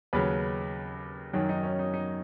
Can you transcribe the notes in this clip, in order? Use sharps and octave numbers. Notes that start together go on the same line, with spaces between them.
D#2 C#3 F#3 B4
F#2 D#3 F#3
D#4
C#4
D#4
D#4